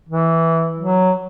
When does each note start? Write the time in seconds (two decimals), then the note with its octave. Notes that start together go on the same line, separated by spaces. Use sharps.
0.09 E3
0.79 F#3